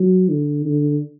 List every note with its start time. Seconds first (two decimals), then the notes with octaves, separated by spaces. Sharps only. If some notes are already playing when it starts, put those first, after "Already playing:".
Already playing: F#3
0.29 D3
0.65 D3